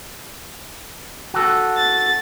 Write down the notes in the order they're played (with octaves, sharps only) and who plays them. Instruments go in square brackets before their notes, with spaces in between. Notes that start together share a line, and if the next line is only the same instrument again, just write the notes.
[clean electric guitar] F#4 A4
[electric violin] A6